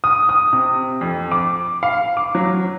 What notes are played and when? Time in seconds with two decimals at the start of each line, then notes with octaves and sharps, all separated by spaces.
0.04 D#6
0.29 D#6
0.53 C3
1.01 F2
1.32 D6
1.83 F5
2.17 D6
2.35 F#3